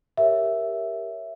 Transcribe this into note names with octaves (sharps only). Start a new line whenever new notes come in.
G4 A#4 C#5 E5